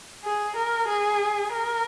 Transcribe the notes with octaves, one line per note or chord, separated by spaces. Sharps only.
G#4
A#4
G#4
A#4